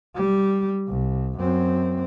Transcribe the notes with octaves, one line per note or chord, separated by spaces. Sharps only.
G3
C2
F#2 C4